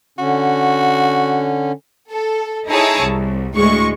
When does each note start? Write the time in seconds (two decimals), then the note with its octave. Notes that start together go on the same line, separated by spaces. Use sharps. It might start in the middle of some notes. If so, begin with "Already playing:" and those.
0.19 D3 C#4 F#4
2.10 A4
2.68 D#4 E4 G#4 C#5 A5 A#5
3.00 C2
3.56 D2 A2 G#3 C#6